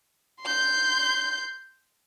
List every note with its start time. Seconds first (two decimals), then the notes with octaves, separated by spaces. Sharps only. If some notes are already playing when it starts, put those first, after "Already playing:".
0.42 C6 G6